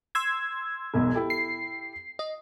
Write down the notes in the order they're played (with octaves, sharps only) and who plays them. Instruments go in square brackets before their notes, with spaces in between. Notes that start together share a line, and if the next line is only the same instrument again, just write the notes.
[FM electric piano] C6 E6 G#6
[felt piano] E1 B1 E2
E4 G4 A4
[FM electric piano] C7
D#5